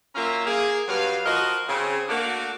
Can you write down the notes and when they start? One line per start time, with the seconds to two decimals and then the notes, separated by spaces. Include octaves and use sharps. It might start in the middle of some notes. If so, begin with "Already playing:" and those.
0.15 F#2 A#3 C#4 F4 E5 A#5
0.46 A#3 G#4
0.88 G2 F#3 F5
1.25 F3 F#4 A#4 D#5
1.69 C#3 C4
2.09 A3 A#3 D4 F#4